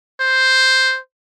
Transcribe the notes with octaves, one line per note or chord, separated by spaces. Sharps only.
C5